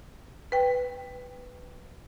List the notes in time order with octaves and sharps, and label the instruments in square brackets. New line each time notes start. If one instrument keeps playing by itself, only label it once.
[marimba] B4 G5